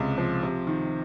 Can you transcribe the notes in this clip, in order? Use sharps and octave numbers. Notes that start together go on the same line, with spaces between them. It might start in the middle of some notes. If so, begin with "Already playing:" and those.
Already playing: C#2 C3 G#3
F3
C3
D#3